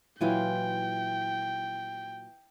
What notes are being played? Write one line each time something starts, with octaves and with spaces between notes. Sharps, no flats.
A#2 E3 F#3 E4 F4 G5 G#5